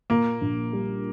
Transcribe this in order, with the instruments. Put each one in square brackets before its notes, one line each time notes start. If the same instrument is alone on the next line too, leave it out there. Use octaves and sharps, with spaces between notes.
[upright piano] A#2 [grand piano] A#3
[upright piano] A#1
G3